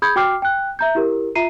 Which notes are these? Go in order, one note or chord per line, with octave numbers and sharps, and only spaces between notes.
G#4 B5 D#6 G6 G#6
F#4 G5 D6 F6 C7
G5 F#6
E5 A#5 G6
E4 G4 A#4
F4 E5 A#5 C7 D#7